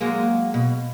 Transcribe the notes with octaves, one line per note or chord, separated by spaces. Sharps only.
F#3 G#3 A#3
B2